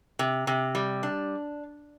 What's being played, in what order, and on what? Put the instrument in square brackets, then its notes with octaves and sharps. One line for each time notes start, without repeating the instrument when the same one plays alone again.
[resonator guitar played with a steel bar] C3
C3
G3
D4